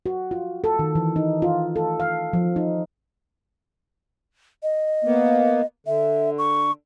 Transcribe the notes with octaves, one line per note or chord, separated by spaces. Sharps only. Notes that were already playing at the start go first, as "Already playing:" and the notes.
F#4
F4
A4
D#3
E3
D#4
F4
A4
F5
F3
D#4
D#5
A#3 B3
D3 E5
C#6